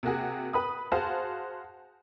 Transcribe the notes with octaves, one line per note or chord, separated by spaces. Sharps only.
C3 A#3 F#4 G#4
B4 B5 D#6
F#4 G#4 C5 F5 A5